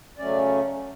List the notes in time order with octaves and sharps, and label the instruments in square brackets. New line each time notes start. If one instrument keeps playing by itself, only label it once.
[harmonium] C#3 F#3 A3 C#4 D5